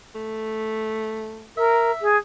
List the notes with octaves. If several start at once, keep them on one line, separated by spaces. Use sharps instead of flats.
A3
A#4 E5
G#4